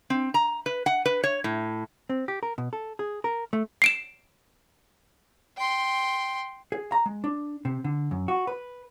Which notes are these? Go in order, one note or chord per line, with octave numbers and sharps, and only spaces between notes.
C4
A#5
B4
F#5
B4
C#5
A2
C4
G4
A#4
B2
A4
G#4
A#4
A3
C7 D7 E7
G5 C6
G#4
A#5
G#3
D4
C3
D3
F#2
F#4
B4